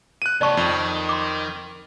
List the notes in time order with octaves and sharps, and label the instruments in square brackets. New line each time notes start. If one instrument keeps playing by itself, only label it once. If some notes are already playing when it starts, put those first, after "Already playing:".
[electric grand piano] F#6 D#7
[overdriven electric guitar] D#2 C3 [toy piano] D5 A5 C#6
[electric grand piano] F2 [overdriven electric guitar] D#3
[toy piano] C6 D6